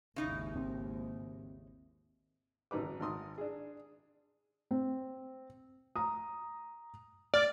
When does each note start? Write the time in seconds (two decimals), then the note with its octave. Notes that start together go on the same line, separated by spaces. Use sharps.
0.16 G#1 D#2 C#3 D#4 E4
0.56 C4
2.71 G#1 F#2 D#4 B4 D6
3.00 G#1 G#2 C6 D#6
3.38 D4 G#4
4.71 C4
5.96 A#5 D#6
7.34 D5 F6